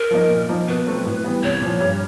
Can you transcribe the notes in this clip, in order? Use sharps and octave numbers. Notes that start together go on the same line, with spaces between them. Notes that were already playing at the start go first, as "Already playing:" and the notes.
Already playing: A#4
F3 A#3 D#4
A#2
F3 A#3 D#4
B2 B4
F#3 A3 C4
A2
E3 G3 B3
C2 C#5
A#2 F3
G2